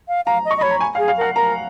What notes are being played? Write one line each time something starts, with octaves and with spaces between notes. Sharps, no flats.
F5
F5 A#5
D#5
C#6
D#5
C#5 B5
A#5
G#5
F5
G#4
F5
A#4 F#5
A#4 A#5